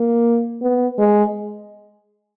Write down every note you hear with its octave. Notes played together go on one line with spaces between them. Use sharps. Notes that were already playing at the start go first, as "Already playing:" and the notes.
Already playing: A#3
B3
G#3